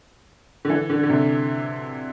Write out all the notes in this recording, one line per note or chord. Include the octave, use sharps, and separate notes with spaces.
D3
E3
D3
D3
C3